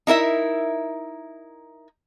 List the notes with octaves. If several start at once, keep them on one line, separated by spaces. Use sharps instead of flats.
D#4 E4 A#4 E5